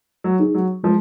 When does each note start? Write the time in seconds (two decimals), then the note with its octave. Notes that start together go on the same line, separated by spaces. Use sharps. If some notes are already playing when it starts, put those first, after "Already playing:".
0.24 F#3
0.39 D#4 G#4
0.54 F#3
0.83 F3 G#3